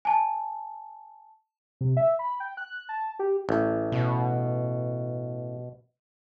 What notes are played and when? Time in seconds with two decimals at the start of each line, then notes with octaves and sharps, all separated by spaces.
0.05 G#5 A5
1.81 C3
1.97 E5
2.19 B5
2.40 G5
2.57 F#6
2.89 A5
3.19 G4
3.49 A1
3.92 B2